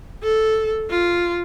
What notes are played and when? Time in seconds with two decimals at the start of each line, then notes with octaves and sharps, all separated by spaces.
0.23 A4
0.90 F4